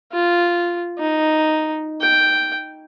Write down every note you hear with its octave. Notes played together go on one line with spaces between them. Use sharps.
F4
D#4
G5